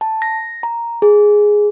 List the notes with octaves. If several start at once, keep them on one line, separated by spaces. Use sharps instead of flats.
A5
A#6
A#5
G#4